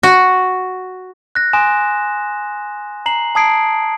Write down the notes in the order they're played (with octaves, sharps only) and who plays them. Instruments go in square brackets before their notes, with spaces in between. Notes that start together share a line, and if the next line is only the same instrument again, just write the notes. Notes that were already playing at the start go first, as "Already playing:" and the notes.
[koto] F#4
[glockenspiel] F#6 A#6
G#5 C6 D#6 E7
A#5 C7 F#7
A5 A#5 D#6 G#6 C7 D7